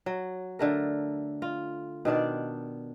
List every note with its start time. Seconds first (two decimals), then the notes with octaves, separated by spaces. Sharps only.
0.06 F#3
0.59 D3 A3 A#4
1.42 F4
2.05 B2 D#3 D4 D5